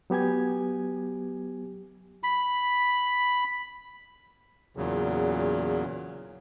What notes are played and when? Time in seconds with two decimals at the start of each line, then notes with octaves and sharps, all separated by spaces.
0.10 F#3 B3 G4 G#5 G#6
2.23 B5
4.77 E2 A#2 C#3 F#3